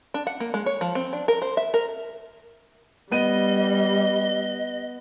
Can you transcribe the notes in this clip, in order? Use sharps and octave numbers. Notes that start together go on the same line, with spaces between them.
D4
F#5
A#3
G#3
C#5
F3
C4
D4
A#4
C5
E5
A#4
G3 B3 D#5 D#7